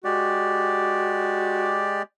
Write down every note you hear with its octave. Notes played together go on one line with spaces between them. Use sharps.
G#3 F#4 G4 D5